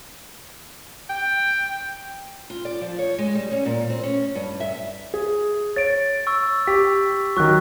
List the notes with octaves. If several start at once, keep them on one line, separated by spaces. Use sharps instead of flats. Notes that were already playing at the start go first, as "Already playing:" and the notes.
G5
F4
D5
F3
C#5
G#3
G3
C#4
A#2
C4
C#4
G2
E5
G#4
C#5 A6 D7
C#6 E6
G4 B6
D#3 F#3 C#6 F#6